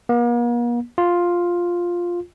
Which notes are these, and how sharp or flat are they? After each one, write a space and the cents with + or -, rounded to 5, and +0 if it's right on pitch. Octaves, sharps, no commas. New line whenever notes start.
A#3 +45
F4 +5